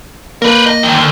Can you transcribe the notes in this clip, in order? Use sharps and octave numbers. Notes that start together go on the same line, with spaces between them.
A#3 A#4 B4
D#5
G#2 D#3
D2